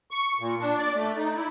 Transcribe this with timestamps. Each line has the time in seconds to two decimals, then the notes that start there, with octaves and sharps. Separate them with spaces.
0.11 C#6
0.40 A#2
0.61 D4
0.78 D5
0.95 A3
1.17 D#4
1.35 E4